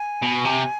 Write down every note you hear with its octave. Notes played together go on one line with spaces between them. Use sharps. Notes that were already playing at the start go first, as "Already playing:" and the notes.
Already playing: G#5
B2
C3